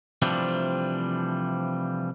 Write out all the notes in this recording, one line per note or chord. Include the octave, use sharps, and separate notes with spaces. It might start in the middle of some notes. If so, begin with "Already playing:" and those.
C3 E3 F3 G3 A3 D4